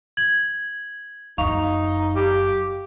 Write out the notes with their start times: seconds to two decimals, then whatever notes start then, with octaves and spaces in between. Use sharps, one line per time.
0.17 G#6 F#7
1.38 F#1 F#2 D#4 F5 C#6 F7
2.16 G4